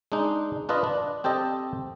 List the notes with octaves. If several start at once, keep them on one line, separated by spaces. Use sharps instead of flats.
G#3 D4 D#4
D4 F4 B4 D#5
D4
C4 G4 A4 D#5